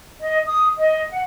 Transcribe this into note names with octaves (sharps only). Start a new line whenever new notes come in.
D#5
D#6
D#5
F#5